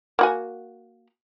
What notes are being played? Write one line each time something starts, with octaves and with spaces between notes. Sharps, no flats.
A#3 F#4 G#5